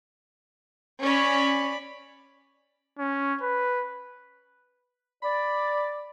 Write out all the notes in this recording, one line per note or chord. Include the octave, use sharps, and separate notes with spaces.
C#4 D5 B5
C#4
B4
D5 B5